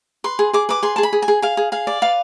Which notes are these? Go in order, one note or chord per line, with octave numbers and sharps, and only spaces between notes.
B4 C6
G#4
G#4 D6
B4 D6
G#4 C6
G#4 A5
B5
G#4
G#5
G#4
G#4 F5
G#4
G#4 F5
D5
B4 F5